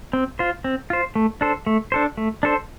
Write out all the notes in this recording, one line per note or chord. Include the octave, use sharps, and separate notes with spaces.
C4
F4 C5
C4
F4 C5
A3
D4 A4 C5
A3
D4 A4 C5
A3
D4 A4 C5